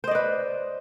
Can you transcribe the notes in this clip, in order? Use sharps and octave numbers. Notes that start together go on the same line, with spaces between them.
B4 C5 D5 D#5